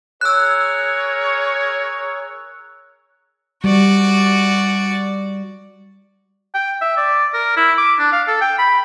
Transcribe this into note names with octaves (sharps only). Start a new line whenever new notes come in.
G#4 A#4 C#5 E6 F#6
G3 F#4 D5
G5
E5
D5
A#4
E4
D6
D4
F5
A4
G5
B5